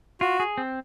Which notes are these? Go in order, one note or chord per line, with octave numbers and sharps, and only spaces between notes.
F4 F#4
G#4
C4